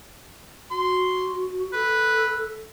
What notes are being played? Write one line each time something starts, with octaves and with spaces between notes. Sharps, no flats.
F#4 C6
A4 B4